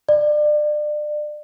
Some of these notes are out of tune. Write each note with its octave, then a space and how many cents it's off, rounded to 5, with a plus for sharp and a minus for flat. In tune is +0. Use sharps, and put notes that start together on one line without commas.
D5 +30